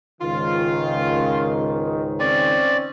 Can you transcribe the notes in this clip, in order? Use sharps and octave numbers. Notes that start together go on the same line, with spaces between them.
C#2 G#2 D#3 F4
C4 C#4 D5